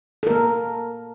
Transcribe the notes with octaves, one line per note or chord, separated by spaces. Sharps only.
A#3 A4 A#4